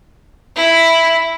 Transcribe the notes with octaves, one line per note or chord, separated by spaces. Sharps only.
E4